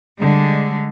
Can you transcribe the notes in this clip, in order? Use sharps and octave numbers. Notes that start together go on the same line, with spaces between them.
D3 G3 G#3